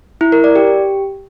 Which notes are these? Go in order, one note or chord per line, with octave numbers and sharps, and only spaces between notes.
E4
A#4
D5
G4